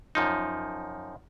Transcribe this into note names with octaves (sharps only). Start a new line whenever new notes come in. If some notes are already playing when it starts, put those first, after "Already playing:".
F#2 F3 D#4